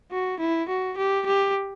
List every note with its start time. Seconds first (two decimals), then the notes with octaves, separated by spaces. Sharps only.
0.12 F#4
0.40 E4
0.69 F#4
0.98 G4
1.26 G4